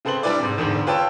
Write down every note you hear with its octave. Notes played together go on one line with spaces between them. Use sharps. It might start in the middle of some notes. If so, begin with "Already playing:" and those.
C#3 C4 A4 B4 C6 F#7
G3 D4 E4 B4 D5
G#2 C3
E2 G#2 D3 D#3
F4 B4 C#5 G5 A5 E6